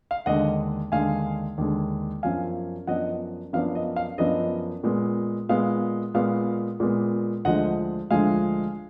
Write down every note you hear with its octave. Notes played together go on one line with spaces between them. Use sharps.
F5
D#2 D3 G#3 D#5 F#5
D#2 D3 G#3 F5 G#5
D#2 D3 G#3
F#2 F3 B3 D4 F5 G#5
F#2 F3 B3 D4 D#5 F#5
F#2 F3 B3 D4 F5
D#5
F5
F#2 F3 B3 D4 D#5
A#2 G#3 B3
A#2 G#3 B3 F5
A#2 G#3 B3 F5
A#2 G#3 B3
D2 D3 F3 G#3 D#5 F#5
D2 D3 F3 G#3 F5 G#5